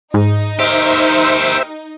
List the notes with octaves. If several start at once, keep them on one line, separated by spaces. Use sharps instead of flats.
G#2 D#4
G4 A#4 C5 E5